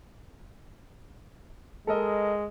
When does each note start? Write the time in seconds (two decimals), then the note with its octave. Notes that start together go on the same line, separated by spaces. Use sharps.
1.87 G#3 A4 A#4 D#5